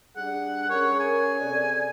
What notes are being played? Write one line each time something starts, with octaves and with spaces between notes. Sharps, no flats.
G3 D4 G#4 F#5
C#4 G#4 A#4 C#5
G#5
C3 A4 D5